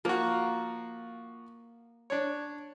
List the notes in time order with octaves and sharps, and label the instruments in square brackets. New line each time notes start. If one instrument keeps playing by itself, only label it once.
[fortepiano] F3 F#4 [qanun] A#3
[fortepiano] D4 C#5